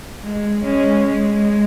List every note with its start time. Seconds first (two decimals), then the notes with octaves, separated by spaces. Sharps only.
0.23 G#3
0.63 G#3 C#4
1.05 G#3